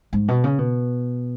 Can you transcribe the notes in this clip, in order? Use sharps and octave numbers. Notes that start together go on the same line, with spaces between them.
G#2
B2
C#3
B2